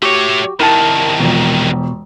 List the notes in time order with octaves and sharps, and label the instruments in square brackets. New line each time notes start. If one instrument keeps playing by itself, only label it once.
[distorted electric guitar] A3 C#5 [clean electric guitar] F#4 G4
[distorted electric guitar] C2 D#3 [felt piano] E4 [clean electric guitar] A#4 A5
[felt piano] E1 F3 [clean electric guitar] B2